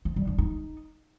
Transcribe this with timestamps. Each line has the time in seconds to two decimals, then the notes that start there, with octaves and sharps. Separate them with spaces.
0.05 F3
0.16 G3
0.27 D4
0.38 D#4